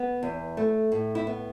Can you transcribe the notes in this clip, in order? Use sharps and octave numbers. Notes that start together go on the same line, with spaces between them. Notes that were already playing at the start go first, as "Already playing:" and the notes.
Already playing: B3
E2
A3
A2
E4
B3